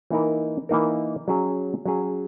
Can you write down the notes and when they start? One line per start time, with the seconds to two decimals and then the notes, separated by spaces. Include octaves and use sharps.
0.10 E3 A#3 D#4 A#4
0.69 E3 A#3 D#4 A#4
1.28 F#3 C#4 G#4
1.85 F#3 C#4 G#4